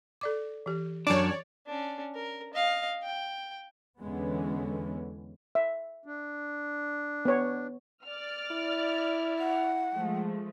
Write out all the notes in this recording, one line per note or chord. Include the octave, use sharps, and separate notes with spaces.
A4 D5 D6
E3 G4
F#2 D4 C#5 D5
C#4 D4
A#4
D#5 F5
G5
E2 D3 E3 G#3 B3 C#4
E5
D4
B3 C#5
D5 F6
E4
F#5
F3 G#3 A3